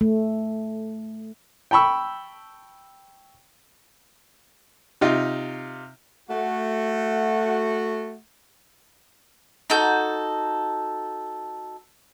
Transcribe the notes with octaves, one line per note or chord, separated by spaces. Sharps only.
A3
G5 A5 B5 C#6 E6
C3 D#4 F4
A3 F#4
D#4 F#4 A4 G6